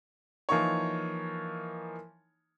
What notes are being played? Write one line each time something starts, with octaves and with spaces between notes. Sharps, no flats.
E3 F3 A#3 D#4 C#5